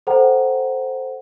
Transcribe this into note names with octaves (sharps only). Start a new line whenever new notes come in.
A4 C5 F#5 G5 A#5